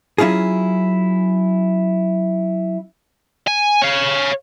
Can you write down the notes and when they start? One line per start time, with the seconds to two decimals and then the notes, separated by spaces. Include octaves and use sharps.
0.18 F#3 C#4 E4 F4 G#4
3.47 G#5
3.82 C#5 F5